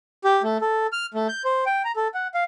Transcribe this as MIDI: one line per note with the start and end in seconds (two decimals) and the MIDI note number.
0.24 0.42 67
0.43 0.58 57
0.61 0.87 69
0.93 1.06 89
1.14 1.27 57
1.29 1.43 91
1.45 1.64 72
1.66 1.82 79
1.85 1.92 82
1.96 2.08 69
2.14 2.27 78
2.34 2.44 77